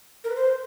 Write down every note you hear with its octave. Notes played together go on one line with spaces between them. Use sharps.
A#4
B4
C5